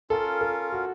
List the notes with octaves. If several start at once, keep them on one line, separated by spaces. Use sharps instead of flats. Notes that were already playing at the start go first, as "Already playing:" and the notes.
C#4 F4 A4 A#4 F5
A4
F#4